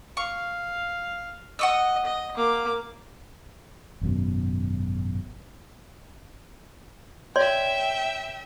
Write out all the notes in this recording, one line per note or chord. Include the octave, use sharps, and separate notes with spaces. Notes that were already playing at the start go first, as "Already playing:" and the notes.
F5 C#6
D#5 F#5 C#6 E6
D#5
A#3 D6
G#1 F#2 B2
C#5 D5 E5 G5 C6